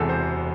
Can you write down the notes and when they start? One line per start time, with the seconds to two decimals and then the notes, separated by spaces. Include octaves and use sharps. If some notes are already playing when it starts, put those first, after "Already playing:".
Already playing: E1 E2 C3 F#4 G#4 A4
0.09 C5